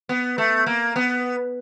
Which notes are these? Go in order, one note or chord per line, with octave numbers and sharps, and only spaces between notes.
B3
A3
A#3
B3